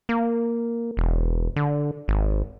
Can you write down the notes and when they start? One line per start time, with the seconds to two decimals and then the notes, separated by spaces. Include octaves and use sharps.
0.09 A#3
0.97 E1
1.56 D3
2.08 G#1